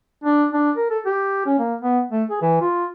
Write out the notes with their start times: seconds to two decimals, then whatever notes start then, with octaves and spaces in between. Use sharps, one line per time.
0.24 D4
0.53 D4
0.76 A#4
0.90 A4
1.06 G4
1.46 C#4
1.59 A#3
1.81 B3
2.12 A3
2.30 G#4
2.42 E3
2.61 F4